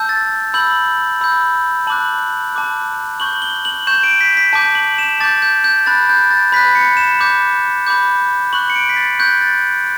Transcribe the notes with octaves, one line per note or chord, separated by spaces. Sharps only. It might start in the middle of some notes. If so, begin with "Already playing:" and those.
Already playing: A5 E6 G6
A6
B5 E6 G6 F#7
B5 E6 G6
A5 D6 F#6 F#7
A5 D6 F#6
C#6 G6 F#7
G7
F#7
C#6 G6 E7
D7
B6
B6
A5 D6 G6
F#7
E7
A5 D6 G6 A6
G6
G6
B5 F#6 A6
G6
A6
B5 F#6 B6
C#7
E7
B5 D6 G6
B5 D6 G6
C#6 F#6 F#7
C#7
D7
B6
A6
C#6 F#6 G6
A6